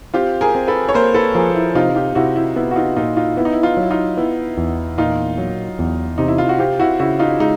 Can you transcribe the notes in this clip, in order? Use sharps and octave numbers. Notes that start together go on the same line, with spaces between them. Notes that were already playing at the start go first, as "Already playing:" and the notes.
C4 F4 G4
G#4 A#4
C4
A4 B4
C#5
A#3 A#4 C5
A4 B4
F3 G#4 A#4
E4
C3 D#4 F4
F4 G4
C3 E4 F#4
E4
B3 E4
F#4
D#4 F4
A#2 D#4 F4
D#4 F4
B3 E4
D#4
E4
D#4 F4
F#3
E4
D#4 F4
B3 E4
E2
A#2 D#4 F4
F#3
E2
C3 D#4
E4
F4
F#4
C4 F4 G4
E4 F#4
C#3 E4 F#4
D#4 F4
G#3 D#4